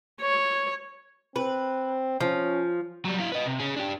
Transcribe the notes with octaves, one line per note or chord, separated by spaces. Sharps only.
C#5
C4 B4
F3 C#4
F#3 G3
E4 F5
B4 D#5
C3
C#4 G#4
D4 G4